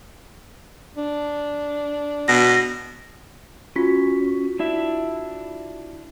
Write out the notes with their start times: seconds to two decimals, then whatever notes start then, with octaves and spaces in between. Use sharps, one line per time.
0.97 D4
2.28 B2 A#6
3.76 C#4 F4 F#4 B6
4.59 D4 E4 E5